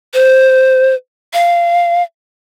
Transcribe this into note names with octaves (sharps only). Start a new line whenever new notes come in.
C5
F5